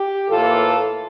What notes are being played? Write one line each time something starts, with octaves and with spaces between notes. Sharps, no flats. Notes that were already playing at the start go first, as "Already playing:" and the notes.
Already playing: G4
A2 E3 A#3 F4 A4